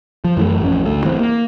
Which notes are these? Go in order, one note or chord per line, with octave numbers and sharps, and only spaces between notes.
F3
F#2 E3 G#3 A3
A1 F2 C#4
D2 A3
A1 E3 G3 C4
A#3